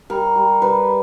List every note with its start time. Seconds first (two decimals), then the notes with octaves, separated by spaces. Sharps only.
0.10 G3 A#4
0.36 G3
0.62 G3 B4